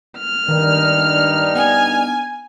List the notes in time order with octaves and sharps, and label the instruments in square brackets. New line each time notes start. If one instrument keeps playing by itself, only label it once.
[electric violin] F6
[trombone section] G2 D4 D#4 [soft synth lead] D#3
[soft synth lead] B3 [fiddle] G#5